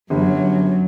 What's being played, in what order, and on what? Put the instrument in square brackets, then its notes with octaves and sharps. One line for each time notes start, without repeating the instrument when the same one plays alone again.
[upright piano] G1 [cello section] F#2 F#3